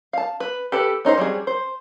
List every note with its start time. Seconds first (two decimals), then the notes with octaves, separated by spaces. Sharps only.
0.13 F5 A5
0.40 B4
0.72 G4 A4 B4
1.05 C#4 D#4 E4 C5
1.17 F#3 G3 C4 G#4
1.47 C5